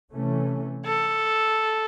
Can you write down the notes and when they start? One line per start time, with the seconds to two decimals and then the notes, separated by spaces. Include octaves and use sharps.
0.13 C3 E3 A3 C#4
0.86 A4